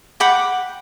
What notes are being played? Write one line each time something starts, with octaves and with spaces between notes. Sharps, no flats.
F#5 G5 B5 D6